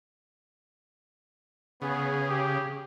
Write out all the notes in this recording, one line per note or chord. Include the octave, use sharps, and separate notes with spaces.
C#3 B3 G#4
G4